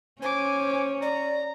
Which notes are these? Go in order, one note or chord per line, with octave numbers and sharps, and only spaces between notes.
C#4 C5 G#5 D6
D5 A#5